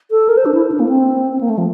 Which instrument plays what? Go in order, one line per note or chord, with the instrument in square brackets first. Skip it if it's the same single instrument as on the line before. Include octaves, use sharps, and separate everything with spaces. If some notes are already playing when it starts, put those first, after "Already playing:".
[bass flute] A4
A#4
C5
D4
E4
D4
A#3
C4
C4
A#3
A3
F3